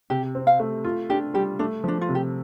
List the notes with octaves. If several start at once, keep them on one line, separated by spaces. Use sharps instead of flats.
C3 G4
C4
F5
A3
F4
D4 G4
G3 G4
A3 D4
F3 D4
F4
C3
G4